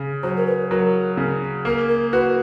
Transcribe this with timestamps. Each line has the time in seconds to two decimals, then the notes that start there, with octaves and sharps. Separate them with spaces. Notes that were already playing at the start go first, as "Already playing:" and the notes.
Already playing: C#3
0.23 F#3 C5
0.36 A#4
0.47 B4
0.70 F#3 A#4
1.17 C#3
1.65 A#3 A#4
1.89 A#4
2.12 F#4 B4